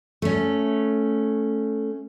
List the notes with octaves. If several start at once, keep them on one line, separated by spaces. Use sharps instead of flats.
A3 C#4